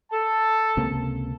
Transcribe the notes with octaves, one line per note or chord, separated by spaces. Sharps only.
A4 A5
C#2 C3 A#3